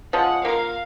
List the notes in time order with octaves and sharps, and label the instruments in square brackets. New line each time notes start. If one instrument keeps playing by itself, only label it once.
[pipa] F3 G#3 C#4 [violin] F#5
[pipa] A#3 F4 A#4 [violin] F5